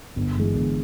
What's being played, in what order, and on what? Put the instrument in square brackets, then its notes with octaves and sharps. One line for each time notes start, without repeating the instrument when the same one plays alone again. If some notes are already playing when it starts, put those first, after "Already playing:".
[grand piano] G1
G2 E3 G#3
G1